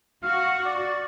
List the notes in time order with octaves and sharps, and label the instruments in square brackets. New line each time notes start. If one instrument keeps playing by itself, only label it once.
[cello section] F#4 [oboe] F5
[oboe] D5